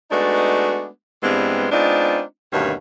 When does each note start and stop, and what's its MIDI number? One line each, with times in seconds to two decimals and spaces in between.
0.11 0.87 56
0.11 0.87 57
0.11 0.87 59
0.11 0.87 62
0.11 0.87 63
0.11 0.87 66
1.23 1.67 43
1.23 1.67 52
1.23 1.67 55
1.23 1.67 56
1.23 1.67 59
1.23 1.67 60
1.72 2.21 56
1.72 2.21 59
1.72 2.21 60
1.72 2.21 62
1.72 2.21 63
1.72 2.21 65
2.52 2.73 38
2.52 2.73 43
2.52 2.73 47
2.52 2.73 51
2.52 2.73 58
2.52 2.73 61